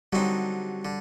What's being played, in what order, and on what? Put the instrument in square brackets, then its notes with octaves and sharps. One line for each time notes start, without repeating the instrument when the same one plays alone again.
[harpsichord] D3 F#3 C4 D#4 [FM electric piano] G3
[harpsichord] D3